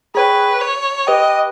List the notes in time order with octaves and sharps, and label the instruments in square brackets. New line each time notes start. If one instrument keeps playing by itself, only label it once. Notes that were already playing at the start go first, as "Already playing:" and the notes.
[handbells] G#4 C#5 G5 [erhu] B4
[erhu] C#5
[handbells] G4 B4 G5 [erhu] D#5